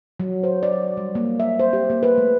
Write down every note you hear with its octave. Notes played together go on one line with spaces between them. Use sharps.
F#3
C5
D5
G3
A#3
E5
C5
G4
A#3
B4
A3